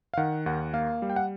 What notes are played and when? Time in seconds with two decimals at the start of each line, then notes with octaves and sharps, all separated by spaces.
0.14 F5
0.17 D#3 F#5
0.46 D#2 F#5
0.73 A#3 F5
1.02 G3
1.10 G5
1.16 F#5